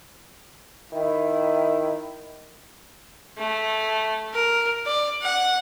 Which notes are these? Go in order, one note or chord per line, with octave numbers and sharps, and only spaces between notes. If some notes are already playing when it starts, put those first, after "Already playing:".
D#3 E4
A3
A#4
D5
F#5